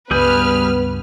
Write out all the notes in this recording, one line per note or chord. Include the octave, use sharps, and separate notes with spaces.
C#2 G2 G3 B3 G#4 B4 F6 G6